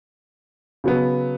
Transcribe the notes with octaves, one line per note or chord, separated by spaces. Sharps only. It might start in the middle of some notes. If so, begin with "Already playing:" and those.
C#3 F#3 B3